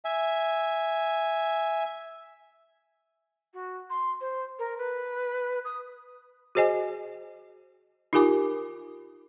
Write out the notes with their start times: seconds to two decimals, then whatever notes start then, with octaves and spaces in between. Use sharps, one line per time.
0.05 E5 G#5
3.53 F#4
3.90 C6
4.21 C5
4.59 A#4
4.78 B4
5.65 D#6
6.55 F#4 G#4 C5 D#5 G#5
8.13 D#4 F4 G4 A#4 G#5 D6